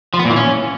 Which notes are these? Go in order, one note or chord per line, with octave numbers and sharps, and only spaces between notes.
F3
B3
A#2
E3
C#4